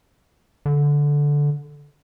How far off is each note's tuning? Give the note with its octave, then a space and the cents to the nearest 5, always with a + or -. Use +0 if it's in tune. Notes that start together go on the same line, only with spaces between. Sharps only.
D3 -10